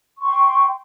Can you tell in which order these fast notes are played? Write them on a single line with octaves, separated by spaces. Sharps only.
C#6 C6 G5